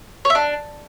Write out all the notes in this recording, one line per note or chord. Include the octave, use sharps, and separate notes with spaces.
C#5
E5
D4